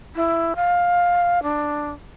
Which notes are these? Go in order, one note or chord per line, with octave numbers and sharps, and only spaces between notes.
E4
F5
D4